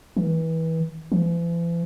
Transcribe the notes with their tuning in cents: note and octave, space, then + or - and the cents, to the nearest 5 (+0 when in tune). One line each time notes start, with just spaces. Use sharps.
E3 -25
E3 +45